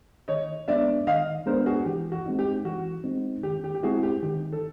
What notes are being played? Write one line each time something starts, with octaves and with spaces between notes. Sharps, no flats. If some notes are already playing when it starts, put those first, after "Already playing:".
D#3 C#5 D#5
G#3 B3 D4 D5 E5
D#3 D#5 F5
G#3 B3 D4 A#4 C5
F#4 G#4
E3 G4
F#4
G#3 C4 D#4
G4
E3 F#4
G#3 C4 D#4
D#3 G4
G4
G4
G#3 C4 E4 F#4 G#4
G4
D#3 G4
A4